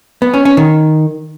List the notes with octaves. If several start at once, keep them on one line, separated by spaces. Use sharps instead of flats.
B3
C#4
C#4
D#3